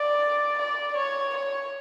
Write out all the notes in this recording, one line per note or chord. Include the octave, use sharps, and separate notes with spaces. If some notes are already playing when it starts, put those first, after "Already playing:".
Already playing: D5
D5
C#5
C#5